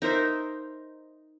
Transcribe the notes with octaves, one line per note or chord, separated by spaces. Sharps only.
D#4 A#4 C5 E5